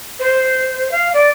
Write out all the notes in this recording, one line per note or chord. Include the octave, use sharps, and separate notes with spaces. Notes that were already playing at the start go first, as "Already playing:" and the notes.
C5
F5
D5